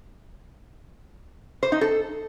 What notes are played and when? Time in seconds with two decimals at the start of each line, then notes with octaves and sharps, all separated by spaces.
1.63 C5
1.72 D#4
1.81 A4